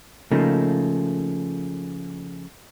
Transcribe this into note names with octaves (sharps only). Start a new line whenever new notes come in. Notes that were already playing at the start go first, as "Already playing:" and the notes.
C#3 F3 A3 A#3 D#4